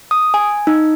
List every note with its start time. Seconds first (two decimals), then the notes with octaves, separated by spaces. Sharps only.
0.11 D#6
0.34 G#5
0.67 D#4